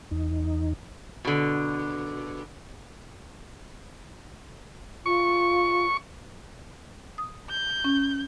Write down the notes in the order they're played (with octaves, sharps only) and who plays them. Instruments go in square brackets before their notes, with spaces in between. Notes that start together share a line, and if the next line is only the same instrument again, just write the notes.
[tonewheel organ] E2 D#4
[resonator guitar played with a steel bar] B2 D3
[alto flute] F4 [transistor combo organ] C#6
[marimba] D#6
[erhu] G6
[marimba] C#4